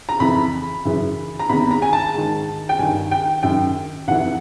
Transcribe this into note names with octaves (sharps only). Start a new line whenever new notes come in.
A#5
F2 C#3 E3 B5
F#2 C#3 E3
A#5
E2 C3 D#3 B5
A#5
G#5
A5
G#2 D#3
G5
G2 D#3 G#5
G5
F#2 D#3 G5
F2 C3 E3 F#5